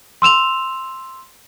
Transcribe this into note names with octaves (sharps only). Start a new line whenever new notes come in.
C6 E6 E7 F7